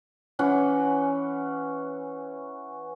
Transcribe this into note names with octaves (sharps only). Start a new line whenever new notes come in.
E3 C#4 F#5